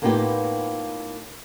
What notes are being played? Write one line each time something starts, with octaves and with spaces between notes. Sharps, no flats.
A2 A#3 B3 D#4 F4 G4